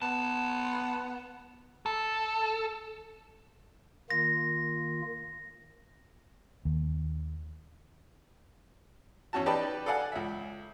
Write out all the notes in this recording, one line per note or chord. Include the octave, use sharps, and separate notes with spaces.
B3 A5
A4
D#3 A#3 F4 A#6
D#2
E2 C#4 F#4 A5
D#4 G4 B4 D5 A5
A4 D5 F5 F#5 G#5
C#2 E5